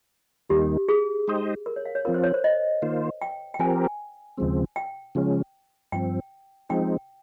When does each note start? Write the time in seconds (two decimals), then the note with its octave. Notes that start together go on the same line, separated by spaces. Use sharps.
0.49 D#2 D#3 G3 A#3 D#4 G4
0.89 G#4
1.28 G#3 D#4 G4 C5 D#5
1.66 A#4
1.76 C#5
1.85 F5
1.95 C#5
2.05 F3 C4 F4 A#4
2.14 C5
2.24 C#5
2.34 C5
2.44 D#5
2.82 D#3 A#3 F4 C5
3.22 G5
3.54 G5
3.59 F3 C4 G4 A#4 G#5
4.37 D#2 C#3 F3 G#3 C4
4.76 G5
5.15 C#3 F3 G#3 C#4
5.92 G2 F3 C4 G5
6.69 F3 G#3 C4 D#4 G5